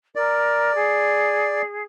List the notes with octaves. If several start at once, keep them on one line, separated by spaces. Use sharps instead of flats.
A#4 D5
G#4